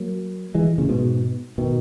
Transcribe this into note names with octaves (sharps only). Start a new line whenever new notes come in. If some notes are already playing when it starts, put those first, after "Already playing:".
Already playing: F#3 A#3
E3 G#3
A#2 C#3
G#2 B2
B2 D#3